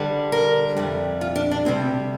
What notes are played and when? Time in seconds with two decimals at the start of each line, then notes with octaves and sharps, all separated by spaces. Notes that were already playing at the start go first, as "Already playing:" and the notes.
Already playing: G2 D3 G3
0.32 A#4
0.77 F2 C3 G3
1.21 F4
1.36 D4
1.51 D4
1.65 D2 C3 G3 C4